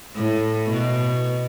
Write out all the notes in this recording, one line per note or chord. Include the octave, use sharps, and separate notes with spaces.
A2
B2